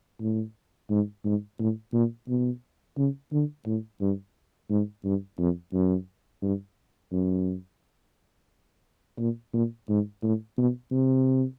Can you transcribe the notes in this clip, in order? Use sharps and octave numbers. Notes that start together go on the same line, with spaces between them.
A2
G#2
G#2
A2
A#2
B2
C#3
D3
A2
G2
G#2
G2
F2
F#2
G2
F#2
A#2
A#2
G#2
A2
B2
C3